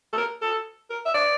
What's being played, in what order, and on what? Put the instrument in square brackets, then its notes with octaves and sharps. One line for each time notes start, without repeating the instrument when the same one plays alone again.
[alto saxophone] A4
A#4
A4
A#4
E5
D5